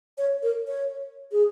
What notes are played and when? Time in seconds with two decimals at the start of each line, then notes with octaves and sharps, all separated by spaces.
0.18 C#5
0.43 A#4
0.67 C#5
1.32 G#4